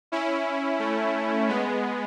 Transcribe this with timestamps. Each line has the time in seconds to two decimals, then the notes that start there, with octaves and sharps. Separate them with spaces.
0.12 C#4 E4
0.79 A3
1.49 G#3 B3